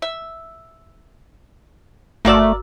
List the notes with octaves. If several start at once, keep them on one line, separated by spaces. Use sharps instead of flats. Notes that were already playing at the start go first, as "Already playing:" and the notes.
E5
G1 A3 A#3 F#4 A#4 D5 E6